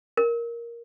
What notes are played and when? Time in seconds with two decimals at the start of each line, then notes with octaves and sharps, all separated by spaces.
0.17 A#4